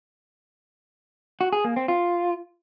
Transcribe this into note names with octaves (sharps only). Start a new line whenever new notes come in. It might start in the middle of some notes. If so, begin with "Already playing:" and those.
F#4
G#4
A#3
C4
F4